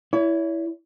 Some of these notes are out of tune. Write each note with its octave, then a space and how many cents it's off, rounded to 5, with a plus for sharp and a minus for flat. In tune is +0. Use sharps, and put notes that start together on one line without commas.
E4 +0 C#5 +40